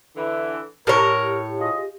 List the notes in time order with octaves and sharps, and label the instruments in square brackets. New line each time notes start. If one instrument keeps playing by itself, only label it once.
[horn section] D3 E3
[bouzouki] A2 C#5 [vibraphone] G4 [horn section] A#4
[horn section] F4 G#4 D#5